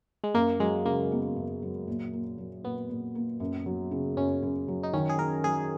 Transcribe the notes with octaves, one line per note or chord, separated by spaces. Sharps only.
G#3
F#2 A#3
F#3 G#3
C#3 A#3
B3
F#2
F#3
A#2
A#3
F#3
A#2 B3
A#2
A#3
F#2
F#3
C#3
F#2 C#4
F#2
F#3
D#4
D#3 C#4
G#4
C#4 A#4
F#3 G#4